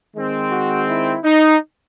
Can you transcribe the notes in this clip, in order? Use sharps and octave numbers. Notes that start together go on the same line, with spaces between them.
D#3 G#3 C4
F#4
E4
D#4